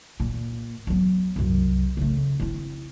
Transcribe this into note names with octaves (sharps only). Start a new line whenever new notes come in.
A#2
F#3 B3
C2 F#2
C#3 A3
C4 E4